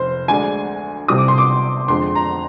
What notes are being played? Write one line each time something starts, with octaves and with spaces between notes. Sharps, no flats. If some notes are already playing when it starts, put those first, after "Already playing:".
Already playing: F1 C5
D2 D3 G#3 D4 G#5
C2 C3 G3 C4 D#6
D6
C6
D6
F2 D3 G#3 C6
A#5